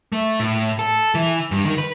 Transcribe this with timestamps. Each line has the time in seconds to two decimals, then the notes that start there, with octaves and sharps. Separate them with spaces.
0.12 A3
0.40 A2
0.79 A4
1.15 E3
1.51 G2
1.65 D#3
1.78 B4